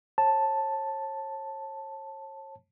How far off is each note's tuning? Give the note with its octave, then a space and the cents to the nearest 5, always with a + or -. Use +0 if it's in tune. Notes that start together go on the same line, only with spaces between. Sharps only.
C#5 -40 A5 +0